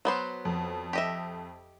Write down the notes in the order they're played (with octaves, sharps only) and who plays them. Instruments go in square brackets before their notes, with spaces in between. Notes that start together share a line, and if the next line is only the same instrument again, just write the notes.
[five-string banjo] F#3 B3 C5
[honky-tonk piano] F2
[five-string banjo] G4 D#5 E5